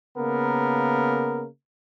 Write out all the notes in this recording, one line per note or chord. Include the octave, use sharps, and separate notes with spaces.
C#3 A#3 B3 A#4